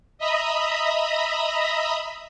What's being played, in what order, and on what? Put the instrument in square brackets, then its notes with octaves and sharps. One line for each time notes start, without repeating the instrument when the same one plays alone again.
[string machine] D#5 E5 A#5 B5 D#6